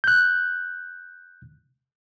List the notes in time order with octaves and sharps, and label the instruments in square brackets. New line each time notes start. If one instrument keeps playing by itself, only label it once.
[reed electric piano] F#6 G6